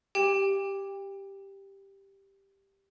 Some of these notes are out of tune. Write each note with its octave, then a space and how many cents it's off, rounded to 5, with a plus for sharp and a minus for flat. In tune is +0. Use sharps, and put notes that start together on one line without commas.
G4 +0 G5 +30